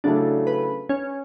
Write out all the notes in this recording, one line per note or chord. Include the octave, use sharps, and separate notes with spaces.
C#3 F#3 A3 D4 E4 A4
B4
C#4